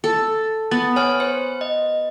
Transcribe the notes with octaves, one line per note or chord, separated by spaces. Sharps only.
A4
B3 A6
C#5 G#5 F6
C5
D#5